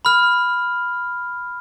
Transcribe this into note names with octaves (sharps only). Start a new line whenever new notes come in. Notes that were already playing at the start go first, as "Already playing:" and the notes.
B5 F6